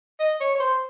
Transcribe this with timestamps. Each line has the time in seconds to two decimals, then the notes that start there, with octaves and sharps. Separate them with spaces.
0.20 D#5
0.40 C#5
0.55 C#5
0.60 C5